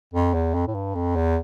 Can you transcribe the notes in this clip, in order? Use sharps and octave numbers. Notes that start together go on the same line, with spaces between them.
F2
E2
F2
A2
G2
F2
E2